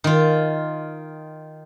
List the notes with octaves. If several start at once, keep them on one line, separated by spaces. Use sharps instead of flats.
D#3 F4